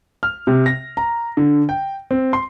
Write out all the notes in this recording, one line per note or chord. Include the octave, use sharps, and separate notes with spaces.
F6
C3
A#6
A#5
D3
G5
C4
C6